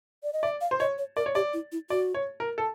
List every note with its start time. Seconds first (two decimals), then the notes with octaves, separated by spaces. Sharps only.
0.23 D5
0.33 D#5
0.43 D5 E5
0.61 F5
0.71 C5
0.80 C#5 D#5
0.98 C#5
1.16 A#4 D5
1.26 C#5
1.35 G4 D5
1.53 E4
1.72 E4
1.90 F#4 D5
2.14 C#5
2.40 A#4
2.58 A4